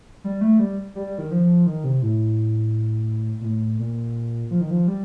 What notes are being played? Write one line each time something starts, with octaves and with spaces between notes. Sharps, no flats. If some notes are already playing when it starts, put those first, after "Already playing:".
G3
A3
G3
G3
G3
D#3
F3
D#3
C3
A2
A#2
A2
A#2
F3
D#3
F3
G3